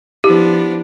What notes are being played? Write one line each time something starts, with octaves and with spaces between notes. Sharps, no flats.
F3 B3 D4 E4 G4